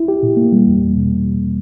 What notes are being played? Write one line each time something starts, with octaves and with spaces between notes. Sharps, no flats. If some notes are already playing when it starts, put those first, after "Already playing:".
Already playing: E4
G4
A#2
A#3
G3
E2
E2
B2